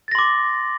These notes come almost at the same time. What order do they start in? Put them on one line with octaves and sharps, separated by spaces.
A6 A#6 C6 D6